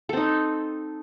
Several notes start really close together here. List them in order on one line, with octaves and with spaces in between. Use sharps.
A4 C4 D#4